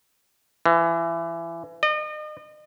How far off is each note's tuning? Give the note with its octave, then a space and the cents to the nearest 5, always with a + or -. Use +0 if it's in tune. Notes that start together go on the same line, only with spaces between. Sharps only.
E3 +25
D#5 -40